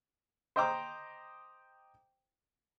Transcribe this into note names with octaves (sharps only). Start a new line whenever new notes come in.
C5 D#5 G5 A#5 D6